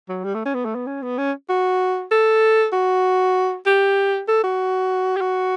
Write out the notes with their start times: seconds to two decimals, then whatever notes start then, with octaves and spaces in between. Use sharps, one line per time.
0.09 F#3
0.24 G3
0.35 A3
0.46 C#4
0.54 B3
0.65 A3
0.75 B3
0.87 C#4
1.02 B3
1.18 C#4
1.49 F#4
2.11 A4
2.73 F#4
3.66 G4
4.28 A4
4.44 F#4
5.17 G4
5.21 F#4